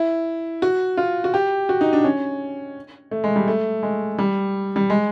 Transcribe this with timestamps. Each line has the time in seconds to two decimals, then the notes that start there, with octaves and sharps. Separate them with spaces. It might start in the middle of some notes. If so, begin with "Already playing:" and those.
Already playing: E4
0.62 F#4
0.97 F4
1.24 F#4
1.34 G4
1.69 F#4
1.81 D#4
1.93 D4
2.04 C#4
3.11 A3
3.24 G#3
3.36 G3
3.48 A3
3.83 G#3
4.18 G3
4.76 G3
4.90 G#3